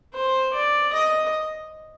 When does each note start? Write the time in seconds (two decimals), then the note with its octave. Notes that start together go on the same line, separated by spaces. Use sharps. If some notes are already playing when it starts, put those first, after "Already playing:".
0.14 C5
0.53 D5
0.93 D#5